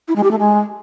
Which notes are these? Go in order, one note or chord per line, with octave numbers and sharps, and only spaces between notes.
E4
G#3
G4
A3
G#3